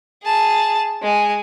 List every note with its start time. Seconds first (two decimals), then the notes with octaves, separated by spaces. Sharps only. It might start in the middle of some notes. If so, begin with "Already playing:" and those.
0.22 G#4 A5
1.02 G#3 G#5